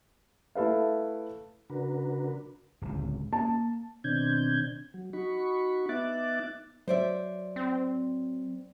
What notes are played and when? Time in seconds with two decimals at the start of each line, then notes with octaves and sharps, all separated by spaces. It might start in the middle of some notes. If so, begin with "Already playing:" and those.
0.55 A3 E4 A4 B4 F5
1.70 C#3 D4 F#4 A#4 B4
2.82 D1 C#2
3.33 A#3 A5
4.04 B2 D#3 C4 D4 G6 G#6
4.94 F#3
5.13 D#4 F#4 B5 C#6
5.89 B3 D#4 E5 D6 F#6 A6
6.88 F#3 C5 D5 E5
7.56 C4